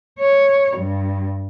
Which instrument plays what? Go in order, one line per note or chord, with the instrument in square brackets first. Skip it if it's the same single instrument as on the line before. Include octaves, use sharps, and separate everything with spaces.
[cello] C#5
G2